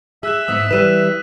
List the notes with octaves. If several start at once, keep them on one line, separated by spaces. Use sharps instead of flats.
G#4 E5 E6 F#6 E7
G#2 B3 D#6 B6
E3 G3 B4 F#6 D#7 E7